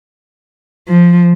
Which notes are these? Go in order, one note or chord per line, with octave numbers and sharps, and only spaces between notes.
F3